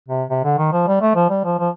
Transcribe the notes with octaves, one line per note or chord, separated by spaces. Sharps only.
C3
C3
D3
D#3
F3
G3
A3
F3
G3
F3
F3